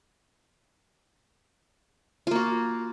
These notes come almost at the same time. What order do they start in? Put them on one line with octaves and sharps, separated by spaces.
F4 A#3 F#4